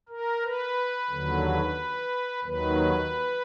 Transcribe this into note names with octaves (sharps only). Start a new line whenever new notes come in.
A#4
B4
D#2 D3 F#3
D#2 D#3 F#3 B4